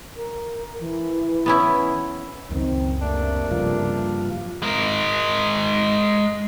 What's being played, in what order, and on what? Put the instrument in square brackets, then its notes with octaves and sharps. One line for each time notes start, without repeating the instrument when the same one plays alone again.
[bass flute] A#4
E3
[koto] B3 C#4 E4
[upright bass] C#2 F#2 [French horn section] D#3 C4
[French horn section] C3 A3 A#3 [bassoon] D4
[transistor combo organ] G2 F3 F4 [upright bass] C#3
[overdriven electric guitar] G#3 A#4